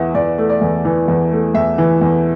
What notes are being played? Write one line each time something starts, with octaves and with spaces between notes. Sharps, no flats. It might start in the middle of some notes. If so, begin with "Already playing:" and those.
Already playing: E2 E3 E5 F#5
E2 D5
A3
D5
E2
E3
E2
A3
E2 E5
E3
E2